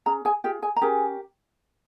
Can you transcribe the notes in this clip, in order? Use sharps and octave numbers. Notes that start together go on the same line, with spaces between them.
C#4 G#4 A#5
G#4 G#5
F4 G4 G#4 G5
G#4 G#5
A#5
C#4 G4 G#4 A#4 G#5